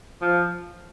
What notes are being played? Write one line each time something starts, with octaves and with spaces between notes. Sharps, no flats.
F3